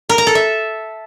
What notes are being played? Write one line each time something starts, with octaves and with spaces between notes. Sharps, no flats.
A#4
A#5
A4
E5